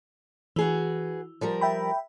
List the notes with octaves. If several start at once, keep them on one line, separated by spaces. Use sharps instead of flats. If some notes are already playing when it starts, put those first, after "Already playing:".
E3 F#4 G#4 B4
F3 G3 A#4
E5 G5 B5